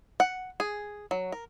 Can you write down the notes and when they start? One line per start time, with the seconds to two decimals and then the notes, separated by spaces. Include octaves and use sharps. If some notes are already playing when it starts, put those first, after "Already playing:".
0.20 F#5
0.60 G#4
1.11 F#3
1.32 A#4